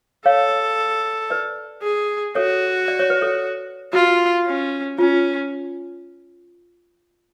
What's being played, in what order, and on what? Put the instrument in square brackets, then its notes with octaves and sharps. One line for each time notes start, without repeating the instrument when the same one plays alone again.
[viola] A4 [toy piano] C#5 F5
[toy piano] B4 D5
[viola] G#4
[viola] F#4 [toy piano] A4 C#5
[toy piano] D5
C#5
B4
A4 C#5
[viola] F4 [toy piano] F#4
[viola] C#4
[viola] C#4 [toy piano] F4